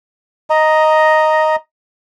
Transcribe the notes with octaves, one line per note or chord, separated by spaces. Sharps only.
D#5 A#5